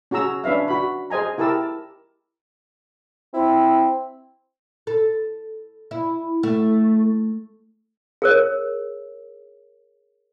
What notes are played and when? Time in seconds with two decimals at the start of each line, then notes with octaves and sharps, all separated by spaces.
0.11 C#4 F#4 G#4 A#5 E6
0.44 C#4 D4 B4 E5 F5
0.68 F#4 B5
1.10 G#4 C5 D#5 G#5 A#5
1.38 E4 G4 A#4 A5 E6
3.34 C4 E4
4.87 A4
5.91 E4
6.43 A3
8.22 G#4 A#4 C#5